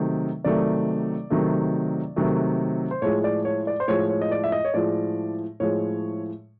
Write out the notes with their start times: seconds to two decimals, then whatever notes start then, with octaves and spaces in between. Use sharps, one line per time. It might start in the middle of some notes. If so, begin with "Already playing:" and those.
Already playing: C3 D#3 F#3 A3
0.44 C3 D#3 F#3 A3 D5
1.30 C3 D#3 F#3 A3
2.16 C3 D#3 F#3 A3
2.91 C5
3.02 A2 F3 G#3 C#5
3.24 D5
3.45 C#5
3.67 D5
3.80 C5
3.88 A2 F3 G#3 C#5
4.09 C#5
4.22 D#5
4.31 D5
4.44 E5
4.52 D#5
4.65 C#5
4.74 A2 F3 G#3 D5
5.60 A2 F3 G#3 C#5